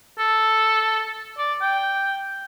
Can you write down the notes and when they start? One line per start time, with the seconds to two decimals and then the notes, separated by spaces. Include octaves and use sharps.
0.19 A4
1.38 D5
1.61 G5